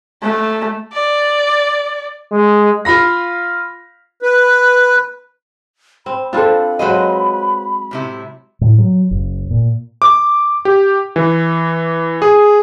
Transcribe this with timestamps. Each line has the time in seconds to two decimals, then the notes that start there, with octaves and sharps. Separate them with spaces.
0.23 A3
0.93 D5
2.32 G#3
2.85 F4 F5 B5 A#6
4.22 B4
6.06 C4 B5
6.33 C4 D4 F4 A4 B5
6.79 F#3 G#3 B4 C5 D#5
7.91 A2 C3 E4
8.61 A2
8.78 F#3
9.11 F#1
9.51 A#2
10.02 D6
10.65 G4
11.16 E3
12.22 G#4